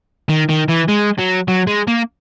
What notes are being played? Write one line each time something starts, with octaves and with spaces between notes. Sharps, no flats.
D#3
D#3
E3
G#3
F#3
F#3
G#3
A#3